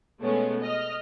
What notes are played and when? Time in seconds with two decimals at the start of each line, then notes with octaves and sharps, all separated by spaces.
0.21 B2 G#3 A3 B3 C#4
0.62 D#5 F6